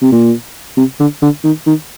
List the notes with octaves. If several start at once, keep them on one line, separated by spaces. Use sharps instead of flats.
C3
A#2
C3
D3
D3
D#3
D#3